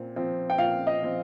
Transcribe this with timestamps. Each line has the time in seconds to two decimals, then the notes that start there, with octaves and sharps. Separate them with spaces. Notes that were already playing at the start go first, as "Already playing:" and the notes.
Already playing: A#2 C4
0.16 F3 C4
0.50 G5
0.58 A#2 F5
0.87 D#5
1.01 F3 C4